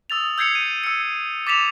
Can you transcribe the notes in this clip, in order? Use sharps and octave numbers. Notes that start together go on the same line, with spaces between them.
D#6 E6 A6 F7
E6 G6 G#6 C7 C#7 F7
D#7
E6 C#7
D6 A6 B6 E7 F7